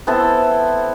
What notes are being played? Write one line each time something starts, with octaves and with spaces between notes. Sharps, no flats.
B3 C4 E4 A4